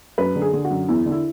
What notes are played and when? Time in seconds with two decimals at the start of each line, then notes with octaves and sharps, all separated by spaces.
0.18 F#2 B4
0.36 D3
0.42 G#4
0.53 D3
0.65 F#4
0.71 F#2
0.88 E2 E4
1.06 D3
1.12 E4